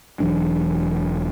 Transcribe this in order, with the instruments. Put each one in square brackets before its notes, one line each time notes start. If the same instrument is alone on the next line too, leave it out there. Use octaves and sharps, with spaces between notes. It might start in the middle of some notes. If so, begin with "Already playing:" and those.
[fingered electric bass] E1 E3 F#3 D4